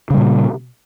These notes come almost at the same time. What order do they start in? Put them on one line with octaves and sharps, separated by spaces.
C#3 G3 A#2